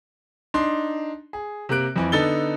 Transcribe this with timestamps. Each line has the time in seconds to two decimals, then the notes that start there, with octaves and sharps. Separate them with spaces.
0.54 D4 D#4 C6
1.33 G#4
1.69 C3 A#3 A#4 F#6 D7
1.96 F2 E3
2.12 D3 B3 D#4 A4 A6 G7